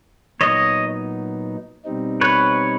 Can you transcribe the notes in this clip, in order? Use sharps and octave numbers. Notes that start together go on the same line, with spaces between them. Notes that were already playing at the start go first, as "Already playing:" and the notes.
A#2 F#3 B3 D#4 C#5 D#5
B2 G3 C4 D#4
B4 C#5